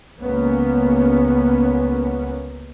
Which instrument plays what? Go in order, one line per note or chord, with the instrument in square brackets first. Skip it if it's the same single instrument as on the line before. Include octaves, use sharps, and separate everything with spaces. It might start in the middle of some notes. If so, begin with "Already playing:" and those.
[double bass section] C#2 A#3 B3 C#4